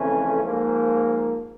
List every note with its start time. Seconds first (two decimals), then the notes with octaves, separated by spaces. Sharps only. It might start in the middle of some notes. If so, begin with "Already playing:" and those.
Already playing: F2 C#3 E3 A3 C#4
0.43 G#2 F3 A#3